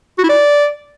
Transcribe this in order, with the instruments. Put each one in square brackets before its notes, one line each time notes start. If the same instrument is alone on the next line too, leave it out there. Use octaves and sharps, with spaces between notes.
[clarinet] F#4
E4
D5